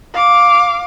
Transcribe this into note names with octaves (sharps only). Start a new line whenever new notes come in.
F5 D6